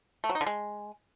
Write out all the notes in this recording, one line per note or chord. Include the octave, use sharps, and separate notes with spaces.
A3
F#3
D#4
D3
G#3